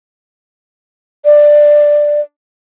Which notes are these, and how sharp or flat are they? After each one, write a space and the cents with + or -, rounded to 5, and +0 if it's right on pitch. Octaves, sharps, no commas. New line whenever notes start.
D5 +10